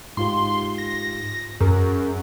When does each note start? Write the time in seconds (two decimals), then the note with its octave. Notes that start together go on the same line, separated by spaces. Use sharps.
0.17 G#2 F4 G4 C6
0.78 A#6
1.60 F#2 G#4 A#4